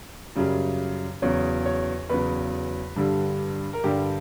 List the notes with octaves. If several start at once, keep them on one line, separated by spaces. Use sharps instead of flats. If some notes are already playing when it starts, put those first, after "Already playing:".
F#2 C#3 G3
E2 C#3 F#3 C#5
C#5
E2 C#3 F#3 B4
G2 D3 G3
A#4
G2 D3 G3 G4